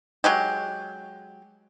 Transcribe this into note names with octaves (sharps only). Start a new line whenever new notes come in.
F#3 G#3 G4